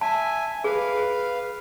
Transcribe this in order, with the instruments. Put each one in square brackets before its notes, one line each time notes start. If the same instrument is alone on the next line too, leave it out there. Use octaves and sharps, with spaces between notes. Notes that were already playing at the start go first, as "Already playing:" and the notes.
[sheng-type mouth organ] E5 G#5 [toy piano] A5
[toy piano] G#4 [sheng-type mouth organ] B4 F5